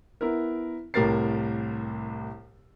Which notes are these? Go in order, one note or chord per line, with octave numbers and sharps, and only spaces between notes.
B3 E4 A#4
C2 A2 G4 A#4 A6 C7